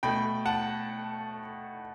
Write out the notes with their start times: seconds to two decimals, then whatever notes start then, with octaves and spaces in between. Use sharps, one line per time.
0.03 B2 A3 G5 B5
0.46 F#5 A5